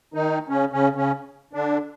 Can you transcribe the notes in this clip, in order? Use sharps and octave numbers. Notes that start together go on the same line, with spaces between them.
D#3 D#4
C#3 C#4
C#3 C#4
C#3 C#4
D3 D4